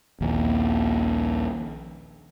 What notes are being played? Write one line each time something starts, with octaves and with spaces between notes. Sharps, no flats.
A#1 D#2